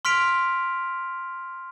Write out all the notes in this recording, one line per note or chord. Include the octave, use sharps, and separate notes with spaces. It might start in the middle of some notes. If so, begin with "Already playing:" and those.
C6 F6 B6 D7 F7